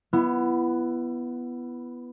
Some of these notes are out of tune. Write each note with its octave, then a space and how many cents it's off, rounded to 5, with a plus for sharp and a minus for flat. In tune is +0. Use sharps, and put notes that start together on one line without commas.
B3 +0 E4 +30